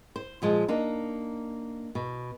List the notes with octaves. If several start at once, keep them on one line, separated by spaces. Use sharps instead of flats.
C5
A#2 F3 G#3
A#3 D4 D#4
B2